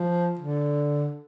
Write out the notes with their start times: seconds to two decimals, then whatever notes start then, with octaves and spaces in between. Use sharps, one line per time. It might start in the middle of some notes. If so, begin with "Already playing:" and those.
Already playing: F3
0.39 D3